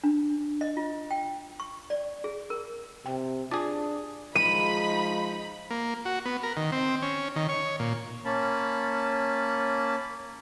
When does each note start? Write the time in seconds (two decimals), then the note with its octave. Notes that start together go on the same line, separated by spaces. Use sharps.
0.04 D4
0.61 D#5
0.77 F4
1.11 G5
1.60 C#6
1.90 D5
2.24 G#4
2.50 A#4
3.06 C3 G5
3.51 D4 F4 G#4 A5 D6
4.35 F3 G#3 D#4 B5 D#7
5.71 A#3
6.05 F#4
6.26 B3
6.43 A#4
6.57 D#3
6.72 C4
7.02 C#4
7.36 D#3
7.49 C#5
7.80 A#2
8.25 A#3 C#4 A5 B5